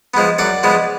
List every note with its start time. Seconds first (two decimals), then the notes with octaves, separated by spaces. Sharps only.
0.14 F3 G#3 B3
0.38 F#2 D5 F#5
0.63 F3 G#3 B3